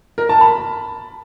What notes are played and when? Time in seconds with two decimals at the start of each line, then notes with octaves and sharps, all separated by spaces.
0.18 A#4
0.29 A5
0.41 B5